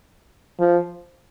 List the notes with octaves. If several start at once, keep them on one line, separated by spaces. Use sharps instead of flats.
F3